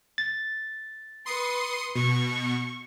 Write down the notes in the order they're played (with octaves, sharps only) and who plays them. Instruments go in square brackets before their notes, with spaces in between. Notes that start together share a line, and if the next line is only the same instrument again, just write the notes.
[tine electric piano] A6
[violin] B4 [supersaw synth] C6 D#6 C#7
[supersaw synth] B2 [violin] C#6